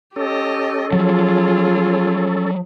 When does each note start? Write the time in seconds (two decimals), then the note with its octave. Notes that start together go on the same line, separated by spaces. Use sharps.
0.16 C#4 G4 A4 D#5
0.93 F3 F#3 F4 G#4